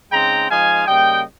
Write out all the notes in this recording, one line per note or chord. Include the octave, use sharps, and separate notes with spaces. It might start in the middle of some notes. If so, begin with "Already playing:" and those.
C#3 G#3 C4 D#4 G5 A#5
F3 G#3 D#4 F5 G#5
C#3 G3 A#3 D#5 G5